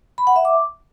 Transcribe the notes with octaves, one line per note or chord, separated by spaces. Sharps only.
B5
F#5
E5
D6